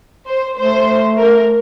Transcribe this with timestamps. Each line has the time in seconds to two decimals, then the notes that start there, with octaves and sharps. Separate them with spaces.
0.28 C5
0.58 A3 C5
1.19 A#4